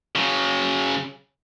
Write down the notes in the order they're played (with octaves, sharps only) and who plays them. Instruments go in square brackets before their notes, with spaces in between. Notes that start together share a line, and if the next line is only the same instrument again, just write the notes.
[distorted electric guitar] C#3 F#3